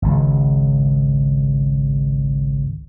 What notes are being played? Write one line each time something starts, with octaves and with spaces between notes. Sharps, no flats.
G#1 C#2